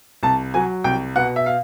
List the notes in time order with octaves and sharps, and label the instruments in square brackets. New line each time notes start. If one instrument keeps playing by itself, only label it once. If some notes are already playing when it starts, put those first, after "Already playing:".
[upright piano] C2 A5
F#3 G#5
C2 G5
B2 F#5
E5
F5